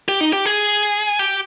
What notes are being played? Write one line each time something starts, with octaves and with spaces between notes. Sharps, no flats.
G4
D#4
G4
G#4
G4